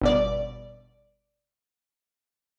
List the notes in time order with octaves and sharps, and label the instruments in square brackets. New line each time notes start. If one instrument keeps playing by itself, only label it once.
[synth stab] G1 B2 D5